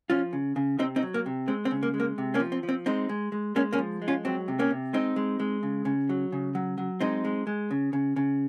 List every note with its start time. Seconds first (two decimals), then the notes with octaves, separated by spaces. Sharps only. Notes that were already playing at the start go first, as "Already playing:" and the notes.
0.10 F3 C#4 F4
0.33 C#3
0.56 C#3
0.79 C3 C4 D#4
0.96 C4 D#4
1.03 F#3
1.14 A#3
1.26 C3
1.48 G#3 C4
1.65 C4
1.71 C#3
1.83 A#3
1.94 G#3
2.00 A#3
2.18 C3
2.34 A#3 C#4
2.40 F3
2.52 C4
2.63 F3
2.69 C4
2.86 G#3 C4 D#4
3.09 G#3
3.32 G#3
3.56 G#3 A#3 C#4
3.73 A#3 C#4
3.78 F3
4.02 G#3
4.08 C#4 F4
4.25 F#3 C4
4.48 C3
4.59 A#3 C#4
4.71 C3
4.93 G#3 C4 D#4
5.16 G#3
5.40 G#3
5.63 C#3
5.85 C#3
6.09 F#3
6.32 C#3
6.55 F#3
6.78 F#3
7.00 G#3 C4 D#4
7.25 G#3
7.47 G#3
7.71 C#3
7.93 C#3
8.16 C#3